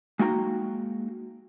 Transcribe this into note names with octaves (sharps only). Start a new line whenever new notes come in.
G#3 A#3 D#4 F#4 G5 A#5